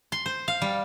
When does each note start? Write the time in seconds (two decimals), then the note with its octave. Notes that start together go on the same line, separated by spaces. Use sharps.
0.12 C6
0.26 C5
0.48 F5
0.62 G3